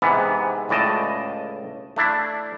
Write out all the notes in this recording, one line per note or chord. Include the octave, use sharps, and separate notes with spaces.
G#2 C3 E3 B3
C#2 A2 D5 D#5 A5
A3 D4 E4